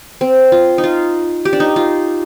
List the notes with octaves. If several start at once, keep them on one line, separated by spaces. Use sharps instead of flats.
C4
F4
D#4
F4
G4
D4
D#4
F4